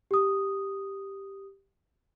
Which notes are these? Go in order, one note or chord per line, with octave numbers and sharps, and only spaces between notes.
G4 D#6